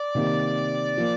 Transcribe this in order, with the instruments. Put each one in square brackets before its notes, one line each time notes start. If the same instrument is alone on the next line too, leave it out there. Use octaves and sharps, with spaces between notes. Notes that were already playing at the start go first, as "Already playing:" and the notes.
Already playing: [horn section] D5
[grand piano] C3 D#3 A#3 D#4 G4
F3 A#3